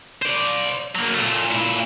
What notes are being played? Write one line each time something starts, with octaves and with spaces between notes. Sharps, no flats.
C5 D5
F#3 A#3
A#2 A3
A#2 E4